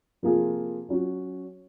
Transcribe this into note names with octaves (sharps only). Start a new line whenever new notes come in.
C3 F3 A#3 F4 G#4
F#3 C#4 F#4